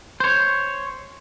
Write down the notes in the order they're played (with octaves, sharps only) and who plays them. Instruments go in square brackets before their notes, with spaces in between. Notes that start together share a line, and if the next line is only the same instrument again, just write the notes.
[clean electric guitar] C5 C#5